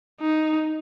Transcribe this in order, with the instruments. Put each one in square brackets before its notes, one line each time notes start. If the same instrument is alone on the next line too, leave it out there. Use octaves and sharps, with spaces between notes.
[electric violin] D#4